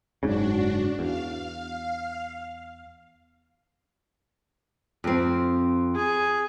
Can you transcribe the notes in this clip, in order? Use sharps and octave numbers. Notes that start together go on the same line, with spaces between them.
F#1 G#2 C#3 D4 F#4
E2 F5
F2 C4
G#4